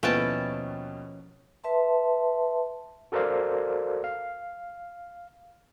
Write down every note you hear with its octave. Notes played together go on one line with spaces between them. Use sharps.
D#2 B2 F3 C#4 E4 B4 G5 A5
B4 E5 A5 C6
F#4 A4 A#4 C5 D5 F5
F5